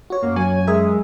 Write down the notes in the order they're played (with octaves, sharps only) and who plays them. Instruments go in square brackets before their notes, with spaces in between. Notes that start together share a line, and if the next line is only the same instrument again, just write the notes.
[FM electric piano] F#4 C#5
[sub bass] F#2 [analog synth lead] A#3
[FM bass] F#3 [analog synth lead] G#5
[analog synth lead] G#3 [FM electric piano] A#4 E5 D#6